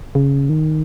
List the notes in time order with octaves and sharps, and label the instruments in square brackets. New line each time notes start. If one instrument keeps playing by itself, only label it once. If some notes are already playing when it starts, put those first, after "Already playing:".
[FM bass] C#3
D#3